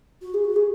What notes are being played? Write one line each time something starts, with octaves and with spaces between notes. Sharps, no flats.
F#4
G#4
F#4
G#4